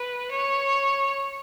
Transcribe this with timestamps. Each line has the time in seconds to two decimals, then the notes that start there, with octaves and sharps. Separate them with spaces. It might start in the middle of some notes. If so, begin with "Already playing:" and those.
Already playing: B4
0.31 C#5